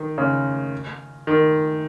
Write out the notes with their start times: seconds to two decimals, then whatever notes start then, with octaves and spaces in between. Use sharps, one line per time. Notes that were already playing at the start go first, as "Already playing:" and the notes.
Already playing: D#3
0.18 C#3
1.27 D#3